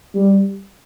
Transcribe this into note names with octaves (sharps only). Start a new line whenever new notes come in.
G3